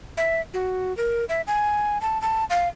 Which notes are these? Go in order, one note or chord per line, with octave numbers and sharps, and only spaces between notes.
E5
F#4
A#4
E5
G#5
A5
A5
F5